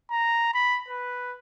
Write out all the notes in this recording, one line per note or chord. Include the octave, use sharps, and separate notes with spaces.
A#5
B5
B4